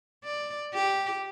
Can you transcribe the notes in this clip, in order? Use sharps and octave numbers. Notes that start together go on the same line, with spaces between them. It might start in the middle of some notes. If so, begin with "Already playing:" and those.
D5
G4